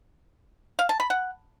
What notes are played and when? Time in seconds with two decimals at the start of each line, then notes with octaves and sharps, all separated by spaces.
0.79 F5
0.89 A5
1.00 B5
1.10 F#5